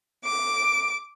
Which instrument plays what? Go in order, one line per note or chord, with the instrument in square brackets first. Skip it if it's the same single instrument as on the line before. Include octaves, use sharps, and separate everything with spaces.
[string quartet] D6